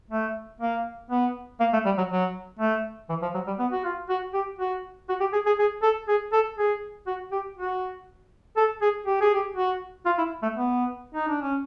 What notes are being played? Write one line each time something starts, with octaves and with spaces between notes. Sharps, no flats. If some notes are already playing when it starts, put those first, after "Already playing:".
A3
A#3
B3
A#3
A3
G3
F#3
F#3
A3
E3
F3
F#3
G3
B3
F#4
F4
F#4
G4
F#4
F#4
G4
G#4
G#4
G#4
A4
G#4
A4
G#4
F#4
G4
F#4
A4
G#4
G4
G#4
G4
F#4
F4
E4
A3
B3
D#4
D4
C#4